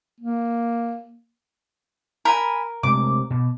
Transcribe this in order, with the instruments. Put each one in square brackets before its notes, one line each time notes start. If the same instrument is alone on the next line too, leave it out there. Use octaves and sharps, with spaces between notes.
[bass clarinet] A#3
[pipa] A#4 [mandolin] G#5 B5
[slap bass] C3 G#3 A3 [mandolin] D6
[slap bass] B2